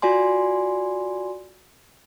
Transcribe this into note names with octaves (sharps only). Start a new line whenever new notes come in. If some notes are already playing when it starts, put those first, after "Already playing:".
F4 F#4 D5 G#5 C6